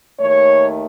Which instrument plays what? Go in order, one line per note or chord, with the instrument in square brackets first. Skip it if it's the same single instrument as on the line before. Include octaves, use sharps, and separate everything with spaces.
[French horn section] D#2 D#3 A3 C#5